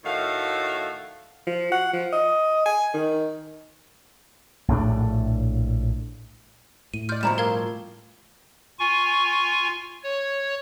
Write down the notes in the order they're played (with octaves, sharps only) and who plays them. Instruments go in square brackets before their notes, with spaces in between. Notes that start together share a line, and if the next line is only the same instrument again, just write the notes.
[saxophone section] A2 D#3 A3 F#4 F5
[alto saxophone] F3
F#5
F3
D#5
G#5
D#3
[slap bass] A#1 A2 A3 D4
[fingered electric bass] A2 [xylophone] D#7
[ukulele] F4 D5 [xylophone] F6 G6
[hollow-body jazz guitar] G2 B2 F3 [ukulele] E4 A#5 B5 [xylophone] E7
[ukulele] D4 A4 [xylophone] A#4 F5 G#6
[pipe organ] F4 G#5 C#6
C#5